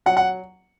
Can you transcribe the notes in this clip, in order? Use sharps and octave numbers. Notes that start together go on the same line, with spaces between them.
F#3 F#5
F#5